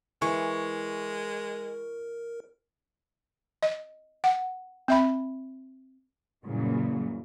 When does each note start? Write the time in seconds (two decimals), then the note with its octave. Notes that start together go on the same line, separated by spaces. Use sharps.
0.22 E3 G#3 A#4 C#6
3.63 D#5
4.24 F#5
4.88 C4 E5 B5
6.45 F#2 A#2 C#3 E3 F#3 G3